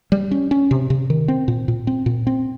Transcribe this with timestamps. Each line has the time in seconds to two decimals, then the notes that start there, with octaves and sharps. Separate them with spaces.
0.12 G3
0.31 C#4
0.51 C#4
0.71 C3
0.90 C3
1.10 D#3
1.28 C4
1.48 A#2
1.68 A#2
1.87 C4
2.06 A#2
2.27 C4